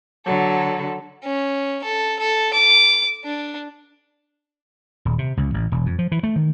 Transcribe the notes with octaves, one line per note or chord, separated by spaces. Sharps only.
D3 F#3 A4
C#4
A4
A4
D6
D4
D#1
C3
C#2
A1
E1
F2
F3
E3
A3
D#3